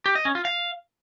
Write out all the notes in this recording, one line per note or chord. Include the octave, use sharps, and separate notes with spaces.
G4
D#5
C#4
F4
F5